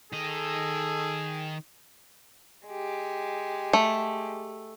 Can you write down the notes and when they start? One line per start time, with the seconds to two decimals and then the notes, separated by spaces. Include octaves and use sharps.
0.13 D#3 G#4 A4 D#5
2.68 G#3 G4
3.73 A3